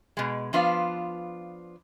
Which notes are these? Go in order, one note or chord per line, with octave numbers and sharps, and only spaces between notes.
B2 G#3
F3 B3 D4 F4 B4 F5